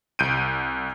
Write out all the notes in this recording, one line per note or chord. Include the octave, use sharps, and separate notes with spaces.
C2 G6 D7 D#7